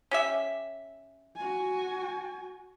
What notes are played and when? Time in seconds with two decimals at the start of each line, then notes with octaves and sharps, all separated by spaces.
0.11 C#4 G4 E5
1.36 F#4 G#5